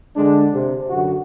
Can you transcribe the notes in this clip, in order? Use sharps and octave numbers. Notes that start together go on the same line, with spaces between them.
D3 G#3 D4
C3
F#2 D3 F#4